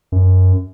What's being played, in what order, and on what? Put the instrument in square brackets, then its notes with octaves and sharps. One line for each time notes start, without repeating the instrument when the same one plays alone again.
[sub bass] F#2